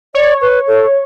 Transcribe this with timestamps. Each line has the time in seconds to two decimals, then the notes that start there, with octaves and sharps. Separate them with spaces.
0.14 C#5 D5
0.41 B4
0.67 A4